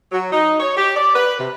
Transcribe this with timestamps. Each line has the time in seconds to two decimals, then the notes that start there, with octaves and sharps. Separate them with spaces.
0.12 F#3
0.32 D#4
0.60 C#5
0.77 G4
0.95 D5
1.15 B4
1.39 C3